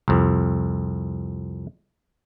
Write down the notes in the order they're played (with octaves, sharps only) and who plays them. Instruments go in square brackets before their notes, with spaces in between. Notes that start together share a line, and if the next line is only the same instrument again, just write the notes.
[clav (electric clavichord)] C2 F2